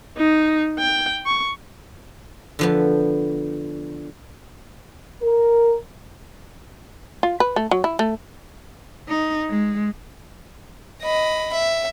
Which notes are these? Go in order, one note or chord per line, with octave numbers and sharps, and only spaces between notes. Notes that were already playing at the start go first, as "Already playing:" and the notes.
D#4
G5
C#6
D3 F3 B3
A#4
F4
B4
A3
F#3
E4
A3
D#4
G#3
D#5 B5
E5